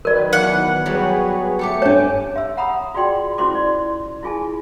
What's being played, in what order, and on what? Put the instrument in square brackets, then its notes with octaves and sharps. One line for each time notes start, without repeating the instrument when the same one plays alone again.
[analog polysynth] D#3 F#3 B4 [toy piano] A#4 D5
[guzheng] E2 [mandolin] F#5
[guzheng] F#3 G3 B3 [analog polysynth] G#4 B4 C#5
[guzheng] A3 G4 A4 [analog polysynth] C#7
[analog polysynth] G2 G3 D6 [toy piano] D4 C#5 [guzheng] G#5 A5
[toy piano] E5 E6
F#5 A#5 B5 D#6
F4 F#4 G#4 D5 G5 C6
C#4 E4 F#4 C5 C6 D6
D5
E4 F4 G#4 G#5 A5